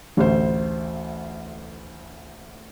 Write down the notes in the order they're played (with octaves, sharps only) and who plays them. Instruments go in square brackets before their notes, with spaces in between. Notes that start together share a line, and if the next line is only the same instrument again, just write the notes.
[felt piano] A1 D2 C5